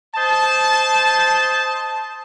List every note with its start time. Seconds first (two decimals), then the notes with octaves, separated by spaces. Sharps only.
0.16 C5 D#5 A5